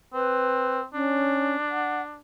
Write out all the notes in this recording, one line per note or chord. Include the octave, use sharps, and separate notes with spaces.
C4 B4
C#4 D4
F#5